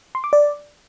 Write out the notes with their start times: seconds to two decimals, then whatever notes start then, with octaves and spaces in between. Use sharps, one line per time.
0.15 C6
0.24 D6
0.33 D5